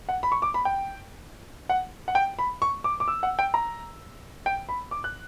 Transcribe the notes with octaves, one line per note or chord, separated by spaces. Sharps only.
F#5
B5
C#6
D6
B5
G5
F#5
F#5
G5
B5
C#6
D6
D6
E6
F#5
G5
A#5
G5
B5
D6
F#6